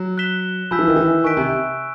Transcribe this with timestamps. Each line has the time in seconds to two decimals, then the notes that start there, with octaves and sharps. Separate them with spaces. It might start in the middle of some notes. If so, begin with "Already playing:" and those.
Already playing: F#3
0.18 F#6 B6 E7 G7
0.71 F3 G#5 B5 E6 G6 B6
0.79 E3
0.87 D#3
0.96 E3
1.24 D#3 G#5 C#6 F#6 B6 D7
1.37 C3